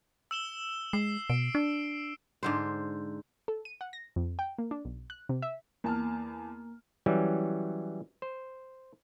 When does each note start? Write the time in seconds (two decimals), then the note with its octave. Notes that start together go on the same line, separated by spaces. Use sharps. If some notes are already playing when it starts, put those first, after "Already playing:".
0.31 E6 E7 G7
0.93 G#3 C7
1.30 B2 D7
1.55 D4
2.43 G#2 D3 C5
3.48 A4
3.65 D#7
3.81 F#5
3.93 A#6
4.16 F2
4.39 G5
4.58 A#3
4.71 D4
4.85 B1
5.10 F#6
5.29 C3
5.42 E5
5.84 E2 A#3 A5 F6
7.06 E3 F#3 G3 C#4
8.22 C5